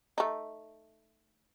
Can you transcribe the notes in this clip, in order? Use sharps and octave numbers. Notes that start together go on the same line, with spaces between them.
A3 D#4